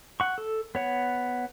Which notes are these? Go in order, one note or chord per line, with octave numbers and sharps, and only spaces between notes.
F#5 C#6
A4
B3 C#5 F#5